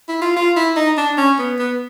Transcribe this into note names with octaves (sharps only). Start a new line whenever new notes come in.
E4
F4
F4
E4
D#4
D4
C#4
B3
B3